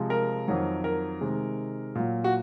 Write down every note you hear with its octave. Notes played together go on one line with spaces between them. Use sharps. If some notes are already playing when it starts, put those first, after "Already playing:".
Already playing: C3 F3 G#3
A#4
F2 D#3 F#3
A#4
C3 D#3 G#3
A#2 F#3
F#4